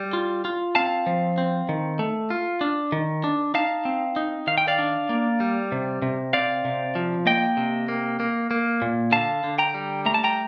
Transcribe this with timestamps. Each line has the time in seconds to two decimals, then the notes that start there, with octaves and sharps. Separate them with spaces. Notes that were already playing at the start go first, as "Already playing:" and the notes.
Already playing: G3
0.13 F4
0.45 F4
0.75 C4 F5 A5
1.07 F3
1.38 C4
1.69 D#3
1.99 A3
2.30 F4
2.61 D4
2.92 D#3
3.24 D4
3.54 D#4 F5 A5
3.85 C4
4.16 D#4
4.47 D#3 F5
4.58 G5
4.68 D5 F5
4.79 D4
5.09 A#3
5.40 G3
5.72 C3
6.02 C3
6.33 C4 D5 F5
6.65 C3
6.95 F3
7.26 A#3 D#5 G5
7.57 C3
7.88 A#3
8.20 A#3
8.51 A#3
8.82 A#2
9.12 D3 F5 A5
9.44 D3
9.58 G5 A#5
9.74 G3
10.06 A3 A#5
10.14 A5
10.24 G5 A#5